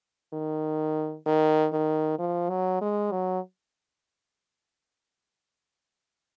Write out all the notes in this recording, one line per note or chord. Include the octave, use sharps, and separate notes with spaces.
D#3
D#3
D#3
F3
F#3
G#3
F#3